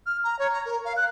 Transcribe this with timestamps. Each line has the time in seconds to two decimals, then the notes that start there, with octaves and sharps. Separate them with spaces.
0.06 F6
0.24 A#5
0.39 C#5
0.53 A#5
0.66 A#4
0.85 F5
0.97 F#6